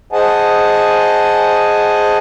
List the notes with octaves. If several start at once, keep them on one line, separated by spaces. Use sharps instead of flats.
G#4 C5 D#5 F#5 G#5 A5